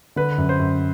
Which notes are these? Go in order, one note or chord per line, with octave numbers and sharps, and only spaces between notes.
D3 B4
F#2
C5
F#2